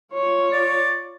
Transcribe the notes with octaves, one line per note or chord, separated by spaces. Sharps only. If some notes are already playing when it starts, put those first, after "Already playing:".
F4 C#5
D5